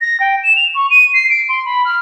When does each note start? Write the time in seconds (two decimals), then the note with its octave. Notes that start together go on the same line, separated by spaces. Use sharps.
0.01 A#6
0.20 G5
0.44 E7
0.56 F7
0.75 C#6
0.90 D#7
1.14 C7
1.30 D7
1.49 C6
1.66 B5
1.85 F6